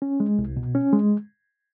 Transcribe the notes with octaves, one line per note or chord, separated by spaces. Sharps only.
C#4
G#3
C2
B2
C#4
G#3